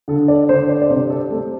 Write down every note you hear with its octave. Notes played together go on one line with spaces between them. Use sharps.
D3 A4
D5
D3 C5
D5
D5
C3 C5
A4
A3 A4